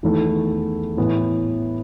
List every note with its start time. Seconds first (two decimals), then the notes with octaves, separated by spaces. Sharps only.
0.03 E2 D#3 A3 E4 A4
0.97 A2 E3 B3